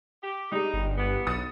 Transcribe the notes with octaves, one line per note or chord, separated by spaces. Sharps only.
G4
G3 G#3 D#4
G1
E3 B3
B1 D#6 A6 C#7